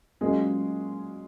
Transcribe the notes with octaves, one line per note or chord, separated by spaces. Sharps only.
A#2 F#3 G#3 A#3 C#4 G#4